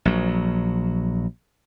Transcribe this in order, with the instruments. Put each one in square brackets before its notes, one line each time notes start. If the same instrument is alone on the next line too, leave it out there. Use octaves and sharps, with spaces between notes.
[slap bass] A#1 F#3